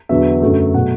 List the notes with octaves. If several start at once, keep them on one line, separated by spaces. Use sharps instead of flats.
E2 D3 F#3 B3 E5
F#2 D3 F#3 A3
B2 F#3 A3 F#5